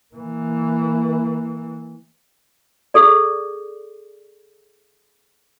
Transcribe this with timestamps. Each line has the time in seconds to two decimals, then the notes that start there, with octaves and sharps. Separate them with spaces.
0.15 E3 A#3
2.94 G#4 A4 D5